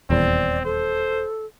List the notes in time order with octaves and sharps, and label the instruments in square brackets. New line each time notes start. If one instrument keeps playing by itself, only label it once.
[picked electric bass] D#1 E2 [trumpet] C4 [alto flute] D5
[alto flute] A4 [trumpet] C5